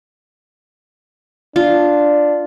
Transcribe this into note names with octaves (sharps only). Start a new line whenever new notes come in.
D4 F4